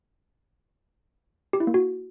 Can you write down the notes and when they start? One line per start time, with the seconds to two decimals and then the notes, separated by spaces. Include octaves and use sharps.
1.53 G4
1.60 E4
1.67 A#3
1.74 F#4